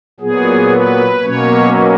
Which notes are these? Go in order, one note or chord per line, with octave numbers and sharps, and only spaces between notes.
A#2 F#3 B3 G#4
B4
B2 F#3 A#3 C#4 C#5